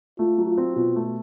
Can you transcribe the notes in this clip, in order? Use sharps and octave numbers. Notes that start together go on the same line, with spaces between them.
A3 F4
F#3
F4
C4
B2 F4
A3